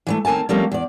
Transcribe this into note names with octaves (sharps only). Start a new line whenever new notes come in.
E3 F3 A3
D#2 C4 A#4 G#5 A5
F3 G3 A3 A#3 C4 C#4
E2 D5